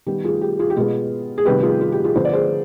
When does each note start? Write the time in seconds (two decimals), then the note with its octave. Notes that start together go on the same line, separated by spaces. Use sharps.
0.06 D#3 G3 B3 G4
0.24 F4 G#4
0.41 G4
0.59 F4 G#4
0.70 G4
0.76 B2 G#3 B3 F4 G#4
1.38 G#4
1.45 C3 D#3 G3 B3 G4 B4
1.63 F4 G#4
1.81 F4
1.92 G4
2.04 F4 G#4
2.15 D3 F3 B3 C5
2.25 D5
2.33 G#4 C5